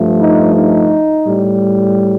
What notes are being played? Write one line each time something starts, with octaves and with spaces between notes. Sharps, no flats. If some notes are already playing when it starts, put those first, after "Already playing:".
Already playing: G2 F3 A3
D#4
D#4
A2 G3